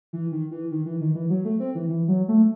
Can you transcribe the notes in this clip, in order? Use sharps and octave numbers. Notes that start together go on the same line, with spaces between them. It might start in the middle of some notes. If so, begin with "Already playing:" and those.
E3
D#3
E3
D#3
E3
D#3
E3
F#3
A3
C4
E3
E3
F#3
A3